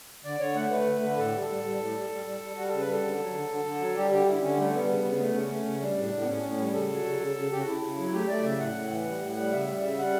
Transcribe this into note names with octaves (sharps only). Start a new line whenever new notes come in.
D3 D5
D3 C#5
A3 F#5
A3 B4
D3
D3
A2 A4
G3
A4
G3
G3
A2
G3
G3
G3
G3
G3 F#4
C#3 A4
B4
G3 A4
D3
F#3
D3
D3
D3
F#3
G3 G4
D3 G4
D3 E4
D3 C#4
G3 A3
G3 B3
C#3
C#3
A3
C#3 C#4
A3
C#3
G3 D4
A2
A2
B3
A2 C#4
A2
G3
C#3 A4
F#3
C#3
C#3
C#3
C#3 G4
F#4
C#3 E4
C#3
F#3
A3 G4
A3 D5
C#3 E5
A2 F#5
A2
E3
G3
A2
G3
C#3 E5
G3
C#3
G3 F#5